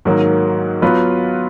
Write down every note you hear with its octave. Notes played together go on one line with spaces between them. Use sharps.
G#2 D#3 F#3 A#3
F#3 B3 F4 B4